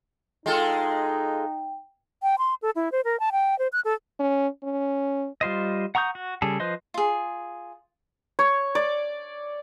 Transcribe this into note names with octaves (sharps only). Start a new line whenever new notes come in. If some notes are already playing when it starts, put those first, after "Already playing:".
G#3 D#4 F4 A4 G5
G5
C6
A4
E4
C5
A#4
A5
G5
C5
F#6
A4
C#4
C#4
G3 F4 C5 D#5
F#5 A#5 C#6 D#6 G6
F#4
C#3 G3 G#4 A4
F3 B4 C5 D#5 C6
F4 G#4
C#5
D5